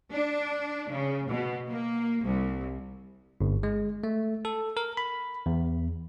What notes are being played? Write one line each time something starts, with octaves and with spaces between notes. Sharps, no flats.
D4
C#3
B2
A#3
C2
G1
G#3
A3
A4
A#4
B5
E2